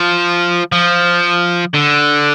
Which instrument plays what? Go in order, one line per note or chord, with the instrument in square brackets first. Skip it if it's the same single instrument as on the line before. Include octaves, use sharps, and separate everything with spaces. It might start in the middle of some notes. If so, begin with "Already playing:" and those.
Already playing: [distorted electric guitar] F3
F3
D3